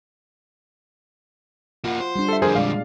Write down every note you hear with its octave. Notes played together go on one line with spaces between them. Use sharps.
A#3 F4 F#4 F#5
C5
G3 D4
A4 E5
F2 D3 G#4 A#4 C5
A#2 G#3 D5 F5